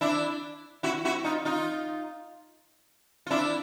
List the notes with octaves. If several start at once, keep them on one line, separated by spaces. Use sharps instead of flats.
D4 E4
E4 F#4
E4 F#4
D#4 F4
D#4 F4
F4
D4 E4